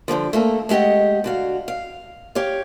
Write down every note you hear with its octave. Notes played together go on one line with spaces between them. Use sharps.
G2 D3 D#3 F3
A3 A#3 A4
G#3 A3 G4 D#5 F#5
D3 F#4 F5
F5
G4 C#5 F5